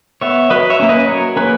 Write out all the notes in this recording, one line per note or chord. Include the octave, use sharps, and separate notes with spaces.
B3 C#5 E5
F#3 B4 D#5
C#5 E5
A#3 C#4
B4 D#5
F#3 A#4 C#5
A#3 C#4 G#4 B4